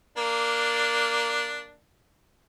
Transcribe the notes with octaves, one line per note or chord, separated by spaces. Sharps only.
A#3 D4